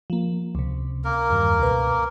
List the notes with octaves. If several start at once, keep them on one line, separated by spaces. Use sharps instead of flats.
F3 A#3
C#2 C3
A#3 A#4
E2 G2 D#3
C#2 B2 B4